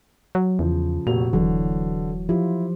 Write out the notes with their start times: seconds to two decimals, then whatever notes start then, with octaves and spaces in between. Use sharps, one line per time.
0.35 F#3
0.59 E2 C#3 F3
1.07 F1 A#2 F#4 F7
1.33 D#1 D3 E3 F#3
2.29 F3 E4 F4 G4